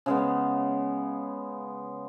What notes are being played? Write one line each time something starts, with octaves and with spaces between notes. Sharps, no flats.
C#3 G#3 B3